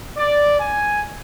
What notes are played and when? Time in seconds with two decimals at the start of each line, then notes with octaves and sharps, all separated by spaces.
0.18 D5
0.61 G#5